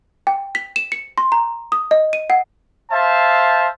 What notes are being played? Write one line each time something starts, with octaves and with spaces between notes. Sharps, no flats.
G5
B6
E7
C#7
C6
A#5
D#6
D#5
D#7
F#5
C5 E5 F5 A5